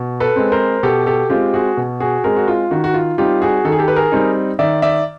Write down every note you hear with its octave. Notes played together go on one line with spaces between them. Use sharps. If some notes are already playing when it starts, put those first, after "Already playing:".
Already playing: B2
A4 B4
G#3 C4
A#4 C5
B2 G4 A4
G4 A4
G#3 C4 F4 G4
F#4 G#4
B2
F#4 G#4
G#3 C4 G#4 A#4
F#4
F4
D#3 F#4
F#4
F4
G3 C4 D#4 F4 G4
F#4 G#4
D#3 A4
G#4
G4 A4
B4
G#4 A#4
G3 C4 D#4
D#3 D5 E5
D5 E5